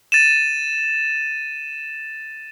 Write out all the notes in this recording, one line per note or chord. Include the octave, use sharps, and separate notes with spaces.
A6 D#7 E7